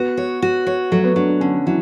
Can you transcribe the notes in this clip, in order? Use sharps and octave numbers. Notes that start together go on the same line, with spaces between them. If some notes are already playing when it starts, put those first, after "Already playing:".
Already playing: B3 F#4
C#5
F#4
C#5
F#3 A3
B3
F#3 D4
D4
D3 C#4
E3 F#3